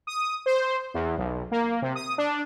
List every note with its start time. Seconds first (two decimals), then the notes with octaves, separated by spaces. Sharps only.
0.07 D#6
0.46 C5
0.94 E2
1.18 B1
1.51 A#3
1.82 C3
1.95 D#6
2.18 D4